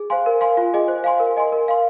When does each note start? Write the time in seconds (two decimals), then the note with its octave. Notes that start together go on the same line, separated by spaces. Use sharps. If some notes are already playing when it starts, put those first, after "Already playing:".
Already playing: G#4
0.10 C5 F5 G#5 C6
0.26 A#4
0.41 F5 G#5 C6
0.57 F4
0.73 G#4 D#5 G#5
0.88 C5
1.04 F5 G#5 C6
1.20 A#4
1.37 D#5 G#5 C6
1.52 A#4
1.68 F5 C6